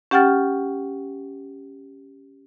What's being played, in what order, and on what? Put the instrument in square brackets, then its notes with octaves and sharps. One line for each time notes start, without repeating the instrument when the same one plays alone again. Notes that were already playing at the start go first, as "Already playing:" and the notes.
[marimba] C#4 G4 F#5 G5 F6 A6